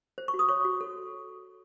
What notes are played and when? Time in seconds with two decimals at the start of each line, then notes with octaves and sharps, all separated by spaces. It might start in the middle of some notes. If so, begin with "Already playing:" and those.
0.18 C5
0.28 C#6
0.34 F#4
0.39 D#6
0.49 C#5 C#6
0.65 F#4
0.81 A4